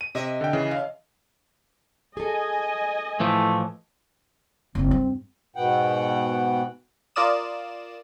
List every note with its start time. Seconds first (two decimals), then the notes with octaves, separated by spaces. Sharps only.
0.01 D#7
0.15 C3 D#5 E5
0.41 D3 G5
0.53 C#3 E3
0.71 C#3 F5
2.17 G#4 A4 D#5 G#5
3.20 A2 E3 F3 A3
4.75 F#1 C#2 C4
4.91 G2
5.56 G#2 B2 B3 F#5 G5
7.16 F4 A#4 D5 D#6 E7